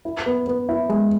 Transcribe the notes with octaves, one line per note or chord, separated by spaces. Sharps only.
E4
B3
B3
E4
G#3